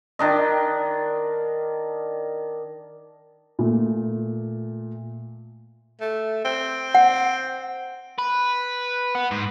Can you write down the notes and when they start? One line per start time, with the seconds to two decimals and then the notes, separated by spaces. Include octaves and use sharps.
0.19 D#3 D4 D#5
3.59 A#2 A3
6.00 A3
6.45 C4
6.95 F#5
8.18 B4
9.15 B3
9.31 G#2